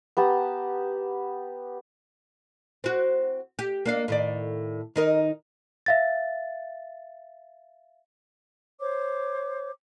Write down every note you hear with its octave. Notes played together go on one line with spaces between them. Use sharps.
B3 G4 A5 A#5
C4 F#4
G4
A#3 D4 F5
A2 D#3 D5
D#3 D#4 A#4
E5 F5 A6
C5 C#5 D6